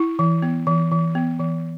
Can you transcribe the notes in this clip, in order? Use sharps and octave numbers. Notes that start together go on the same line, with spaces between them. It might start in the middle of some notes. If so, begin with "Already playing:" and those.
Already playing: E4
E3
B3
E3
E3
B3
E3